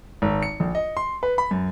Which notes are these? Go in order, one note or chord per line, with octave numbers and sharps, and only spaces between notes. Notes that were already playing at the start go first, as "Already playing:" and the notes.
G#1
C#7
A#1
D#5
C6
B4
B5
F#2